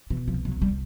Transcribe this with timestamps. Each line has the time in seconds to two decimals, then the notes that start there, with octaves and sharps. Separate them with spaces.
0.10 B2 E3
0.28 F3
0.33 C2
0.45 F#3
0.56 C2
0.62 G3